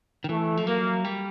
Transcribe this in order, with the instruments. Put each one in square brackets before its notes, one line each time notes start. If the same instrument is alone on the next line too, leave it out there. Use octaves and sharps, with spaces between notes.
[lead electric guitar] D#3
[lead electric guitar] E3 [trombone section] A3
[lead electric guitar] F3
[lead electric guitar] F#3 [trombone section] A#3
[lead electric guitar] G3